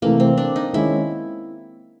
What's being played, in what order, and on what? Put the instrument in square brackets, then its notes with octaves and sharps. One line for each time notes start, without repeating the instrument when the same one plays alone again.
[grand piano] C3 E3 A3 [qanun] A#3
[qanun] C4
D4
D#4
[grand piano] D#3 G#3 C#4 [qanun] E4